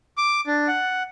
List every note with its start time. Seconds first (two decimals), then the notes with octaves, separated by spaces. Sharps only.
0.18 D6
0.47 D4
0.68 F#5